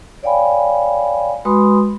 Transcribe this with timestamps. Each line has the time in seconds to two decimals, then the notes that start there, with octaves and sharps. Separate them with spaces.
0.23 C#5 D5 F5 G5 G#5 B5
1.45 G#3 F#4 B4 B5 C6 D#6